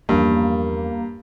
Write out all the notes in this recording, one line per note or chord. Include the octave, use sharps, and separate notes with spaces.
E2 G2 F3 A#3 C#4